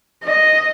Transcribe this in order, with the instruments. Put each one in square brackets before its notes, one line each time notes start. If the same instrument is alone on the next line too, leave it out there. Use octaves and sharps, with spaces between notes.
[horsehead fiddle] D#5